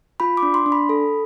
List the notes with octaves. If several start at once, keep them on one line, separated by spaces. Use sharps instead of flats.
F4 B5
D6
D4
C6
D4
B5
A4